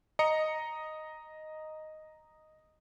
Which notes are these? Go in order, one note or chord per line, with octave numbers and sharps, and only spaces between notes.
D#5 A#5 C#7